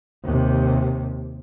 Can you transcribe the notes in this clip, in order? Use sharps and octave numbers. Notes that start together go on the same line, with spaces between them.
D#2 C3